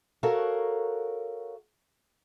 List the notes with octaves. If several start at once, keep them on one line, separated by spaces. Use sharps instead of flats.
F#4 A4 A#4 C#5 F5 F#5